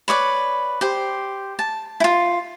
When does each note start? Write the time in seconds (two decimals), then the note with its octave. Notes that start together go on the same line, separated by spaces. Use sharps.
0.08 B4 C#5 D5 D6
0.81 G4 C5
1.59 A5
2.00 E4 F4